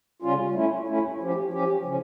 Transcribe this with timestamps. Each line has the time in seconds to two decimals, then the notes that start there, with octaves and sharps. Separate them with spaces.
0.22 C#3 G3 C#4 F4
0.54 A3 C#4 E4
0.87 A3 C#4 E4
1.20 F3 C#4 G4
1.52 F3 C#4 G4
1.85 C#3 F3 C#4